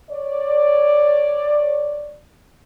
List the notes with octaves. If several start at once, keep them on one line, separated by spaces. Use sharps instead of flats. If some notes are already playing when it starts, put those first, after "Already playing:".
C#5 D5